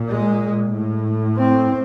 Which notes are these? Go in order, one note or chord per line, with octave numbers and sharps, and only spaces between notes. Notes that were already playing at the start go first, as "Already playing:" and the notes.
Already playing: A#2
G#3
A2
C4